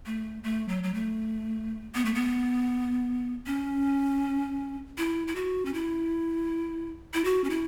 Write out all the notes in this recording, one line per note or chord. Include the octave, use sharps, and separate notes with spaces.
A3
A3
F#3
F#3
A3
B3
A3
B3
C#4
E4
E4
F#4
C#4
E4
E4
F#4
C#4
E4